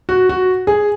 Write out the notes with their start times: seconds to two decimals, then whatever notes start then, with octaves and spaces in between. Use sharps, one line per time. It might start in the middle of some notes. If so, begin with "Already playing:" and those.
0.09 F#4
0.29 F#4
0.67 G#4